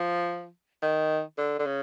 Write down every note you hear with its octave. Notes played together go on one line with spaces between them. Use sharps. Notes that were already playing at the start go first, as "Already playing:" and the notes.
Already playing: F3
D#3
D3
D3
C#3